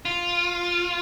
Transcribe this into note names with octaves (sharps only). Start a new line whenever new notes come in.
F4